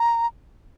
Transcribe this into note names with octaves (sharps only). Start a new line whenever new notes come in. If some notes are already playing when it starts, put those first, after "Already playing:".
Already playing: A#5